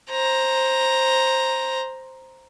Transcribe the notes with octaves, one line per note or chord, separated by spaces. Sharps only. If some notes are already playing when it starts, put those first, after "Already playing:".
C5 A#5